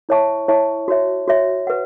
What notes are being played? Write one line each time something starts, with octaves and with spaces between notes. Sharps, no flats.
E4 C#5 E5 A5 C#6
E4 C#5 E5 A5 C#6
F#4 C#5 E5
F#4 C#5 E5
B4 F#5